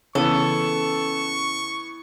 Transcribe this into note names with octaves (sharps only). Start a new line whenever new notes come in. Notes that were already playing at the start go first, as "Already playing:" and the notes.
C#3 E3 B3 A4 C#6